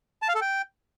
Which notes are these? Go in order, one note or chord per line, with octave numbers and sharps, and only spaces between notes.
A5
F5
A4
G5